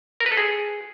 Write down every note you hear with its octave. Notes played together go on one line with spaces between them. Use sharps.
A#4
B4
A4
G#4